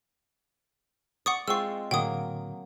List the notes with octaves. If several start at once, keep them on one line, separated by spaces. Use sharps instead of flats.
D5 F#5 C#6 D#6
G#3 C4 F4 C#6 E6
A2 D3 F#3 A#3 F#5 G5 D#6